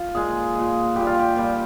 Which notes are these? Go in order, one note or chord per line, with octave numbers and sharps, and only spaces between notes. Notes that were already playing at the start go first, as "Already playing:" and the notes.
Already playing: F4
A#2 G#3 G#4
A#2 G#3
A#2 G3 G4
F4
G4
A#2 G3